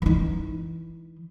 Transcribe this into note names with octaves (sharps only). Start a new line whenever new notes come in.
E3 D#4